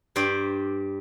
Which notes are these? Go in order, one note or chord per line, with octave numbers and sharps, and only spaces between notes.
G2 G3 C5 D5